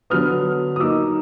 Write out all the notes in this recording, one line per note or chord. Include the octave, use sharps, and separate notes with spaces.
D3 F#3 B3 D#6 F6
D#6
F#3 A#3 D#4 D6 E6